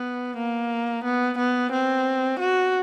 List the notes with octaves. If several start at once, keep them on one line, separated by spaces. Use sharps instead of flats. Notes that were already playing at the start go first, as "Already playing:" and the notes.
Already playing: B3
A#3
B3
B3
C4
F#4